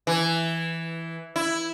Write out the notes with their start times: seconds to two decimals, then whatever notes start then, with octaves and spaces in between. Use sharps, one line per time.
0.07 E3
1.36 E4